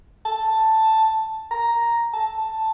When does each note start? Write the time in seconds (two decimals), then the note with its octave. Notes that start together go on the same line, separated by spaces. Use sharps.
0.25 A5
1.51 A#5
2.14 A5